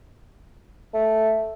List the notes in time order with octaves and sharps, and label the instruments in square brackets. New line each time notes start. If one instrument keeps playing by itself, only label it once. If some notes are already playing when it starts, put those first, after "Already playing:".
[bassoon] A3